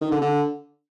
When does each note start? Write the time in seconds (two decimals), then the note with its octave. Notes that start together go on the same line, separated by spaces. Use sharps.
0.01 D#3
0.11 D3
0.21 D3